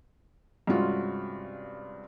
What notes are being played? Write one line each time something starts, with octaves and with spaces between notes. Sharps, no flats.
G2 C3 G#3 C#4 F4 F#4